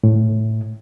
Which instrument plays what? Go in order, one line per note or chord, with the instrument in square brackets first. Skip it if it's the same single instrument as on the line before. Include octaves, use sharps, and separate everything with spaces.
[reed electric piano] A2